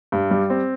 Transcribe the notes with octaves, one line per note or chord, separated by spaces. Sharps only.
G2
G3
C4